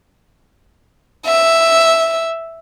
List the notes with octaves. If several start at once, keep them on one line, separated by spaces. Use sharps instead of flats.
E5